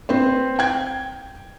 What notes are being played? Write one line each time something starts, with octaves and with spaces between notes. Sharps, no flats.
C4 B4 C5
G5 G#6